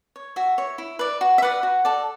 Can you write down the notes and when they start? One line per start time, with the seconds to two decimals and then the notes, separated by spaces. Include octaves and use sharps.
0.16 C#5
0.36 F#4 E5
0.58 C#5
0.78 E4
0.99 B4 D5
1.21 F#4
1.38 E5
1.42 B4 D5 F#5
1.63 F#4
1.85 A4 D5